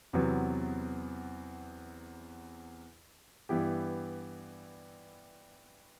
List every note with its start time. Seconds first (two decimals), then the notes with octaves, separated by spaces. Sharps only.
0.13 E2 C3 F#3 B3
3.49 G2 E3 B3 E4 G4